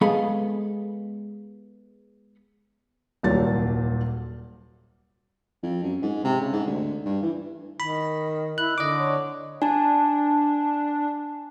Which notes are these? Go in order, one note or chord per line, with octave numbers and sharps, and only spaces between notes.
G#3 B3 G#4 A4 F5 B5
D#1 C2 A#2 F#3 C#5 A6
F2
F#2
G#2
C3
C#3
G#2
D2
G2
E3
D#3 B5
E4 F#6
D3 D#5 D6
C#5
D4 G#5 A5